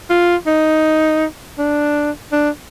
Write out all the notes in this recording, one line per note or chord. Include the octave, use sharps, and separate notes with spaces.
F4
D#4
D4
D4